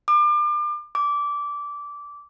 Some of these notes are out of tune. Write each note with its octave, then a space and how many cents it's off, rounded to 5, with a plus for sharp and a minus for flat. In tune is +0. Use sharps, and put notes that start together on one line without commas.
D6 +35
D6 -15